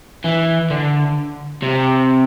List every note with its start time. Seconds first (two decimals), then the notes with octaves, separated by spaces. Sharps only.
0.24 E3
0.70 D3
1.63 C3